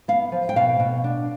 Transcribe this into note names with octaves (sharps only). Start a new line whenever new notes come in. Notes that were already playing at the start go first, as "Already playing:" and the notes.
B3 F5
F3
G5
B2 F5
B2
D4